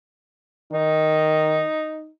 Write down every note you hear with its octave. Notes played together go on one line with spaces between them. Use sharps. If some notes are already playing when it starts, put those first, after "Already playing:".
D#3 D#4